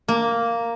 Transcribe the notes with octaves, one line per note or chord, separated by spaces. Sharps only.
A#3